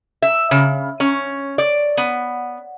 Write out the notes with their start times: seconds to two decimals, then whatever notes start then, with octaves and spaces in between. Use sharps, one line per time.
0.22 E5
0.51 C#3
1.00 C#4
1.58 D5
1.97 B3